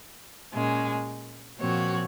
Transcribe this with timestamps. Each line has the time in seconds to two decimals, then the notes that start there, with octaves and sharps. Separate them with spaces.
0.53 A#2 G#3 C#4
1.58 A#2 F3 C4 F#4 C#5